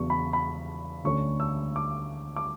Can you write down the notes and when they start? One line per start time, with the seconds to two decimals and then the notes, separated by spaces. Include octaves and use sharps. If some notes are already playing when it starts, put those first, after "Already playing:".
Already playing: E2 C#3 F#3 B3 D4 C#6
0.10 B5
0.33 B5
1.04 D2 D3 A3 C#4 C#6
1.40 E6
1.76 D6
2.36 D6